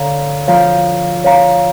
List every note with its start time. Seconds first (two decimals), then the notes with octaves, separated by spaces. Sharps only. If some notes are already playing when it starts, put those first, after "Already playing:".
Already playing: D3 C#5 F5 A#5
0.48 F3 C#5 F5 A#5
1.24 C#5 F5 A#5